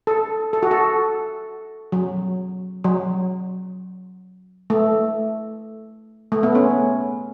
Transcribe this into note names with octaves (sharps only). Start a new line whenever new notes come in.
A4
A4
F#4
A4
F#3
F#3
A3
A3
B3
C#4